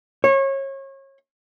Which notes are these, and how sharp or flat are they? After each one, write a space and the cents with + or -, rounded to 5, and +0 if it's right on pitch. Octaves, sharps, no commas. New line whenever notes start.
C#5 -30